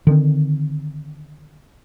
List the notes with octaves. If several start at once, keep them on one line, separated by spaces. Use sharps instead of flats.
D3 D#3 C4